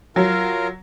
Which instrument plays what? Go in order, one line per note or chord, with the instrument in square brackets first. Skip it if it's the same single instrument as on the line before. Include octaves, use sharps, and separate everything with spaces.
[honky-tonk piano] F#3 [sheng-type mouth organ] F4 A#4